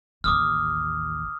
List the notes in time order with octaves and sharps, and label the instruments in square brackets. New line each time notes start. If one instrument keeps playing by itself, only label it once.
[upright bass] A1 D#2 [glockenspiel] D6 D#6 F6